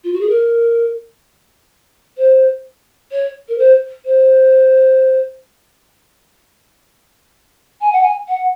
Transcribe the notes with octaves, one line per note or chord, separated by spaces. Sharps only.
F4
F#4
G#4
A#4
C5
C#5
A#4
C5
C5
G#5
F#5
G#5
F#5